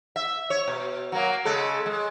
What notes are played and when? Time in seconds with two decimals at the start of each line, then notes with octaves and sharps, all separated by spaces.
0.16 E5
0.50 C#5
0.68 B2
1.12 F#3 A#3
1.45 C#3 G#3 A4
1.86 G#3